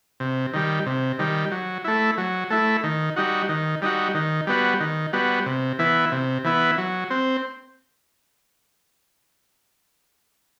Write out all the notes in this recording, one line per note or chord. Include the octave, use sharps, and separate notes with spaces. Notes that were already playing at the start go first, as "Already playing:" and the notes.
C3
D#3 G3
C3
D#3 G3
F#3
A3 E4
F#3
A3 E4
D#3
G3 D#4 F#4
D#3
G3 D#4 F#4
D#3
G3 B3 F#4
D#3
G3 B3 F#4
C3
E3 B3 E4
C3
E3 B3 E4
F#3
C4